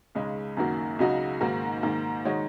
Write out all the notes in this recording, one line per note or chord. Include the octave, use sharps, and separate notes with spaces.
C#2 C#3 G#3 D#4
F#2 D#3 A#3 F#4
C#2 C#3 F#3 D#4 F#4
G#2 D#3 A#3 F#4
G#2 D#3 A#3
D#3 G#3 F#4 C#5